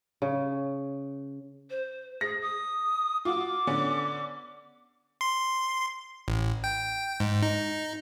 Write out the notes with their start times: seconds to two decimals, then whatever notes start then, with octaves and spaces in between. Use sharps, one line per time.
0.22 C#3
1.70 C5
2.21 G#4 A#6
2.42 D#6
3.25 F4 F#4 D6
3.67 D3 B3 C#4
5.21 C6
6.28 A1
6.64 G5
7.20 G#2
7.42 D#4